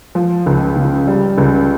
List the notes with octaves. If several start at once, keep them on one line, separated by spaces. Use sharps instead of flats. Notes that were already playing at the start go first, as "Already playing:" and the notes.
F3
C#2
C#3
G3
C#2